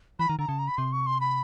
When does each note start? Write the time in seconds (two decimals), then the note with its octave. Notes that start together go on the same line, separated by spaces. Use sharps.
0.19 E3 B5
0.29 D#3 A#5
0.39 D3 A#5
0.48 C#3 A5
0.59 A#5
0.68 B5
0.78 C3 C6
0.92 C#6
1.07 C6
1.21 B5